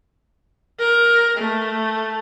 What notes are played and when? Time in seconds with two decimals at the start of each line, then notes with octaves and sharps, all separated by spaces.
0.79 A#4
1.37 A3